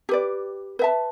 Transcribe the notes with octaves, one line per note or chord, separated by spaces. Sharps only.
G4 B4 D5
B4 E5 A5